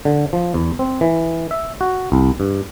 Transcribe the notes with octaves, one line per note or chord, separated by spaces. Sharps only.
D3
F3
E2
C4
E3
E5
F#4
C2
G2